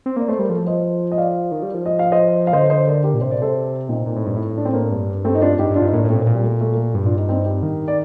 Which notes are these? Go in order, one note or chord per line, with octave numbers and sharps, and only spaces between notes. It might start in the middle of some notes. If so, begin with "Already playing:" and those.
C4
A#3 D5
A3 C5
G3 A#4
F3 F4 A4
C5 D#5
D#5
D5 F5
D#3
G3
F3
D#5
F5
C5 D#5
F5
D3 C5 D#5
C5 D#5
A#4 D5
G4 A#4
A#2
C3 C5
D5
A4 C5
A#2 C4 D#4
A#2
A2
G2
A2
D4
C4
A#3 D4
G2
A3 C4
D#4
D4 F4
G2 D#4 G4
G2
D4 F4
G2 D#4
A2 A#3 D4
A2
A3 C4
A#2
A#2
G3
A3
A3
A#3
A3
G2 G3
D4 F4
D#4 G4
C4 D#4
D#4 G4
D#3
D5